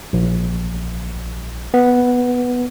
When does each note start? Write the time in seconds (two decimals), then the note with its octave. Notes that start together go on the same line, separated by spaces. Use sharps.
0.13 A#1
1.74 B3